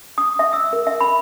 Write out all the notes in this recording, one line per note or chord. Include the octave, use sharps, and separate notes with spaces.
D#6
E5
E6
A#4
E5
B5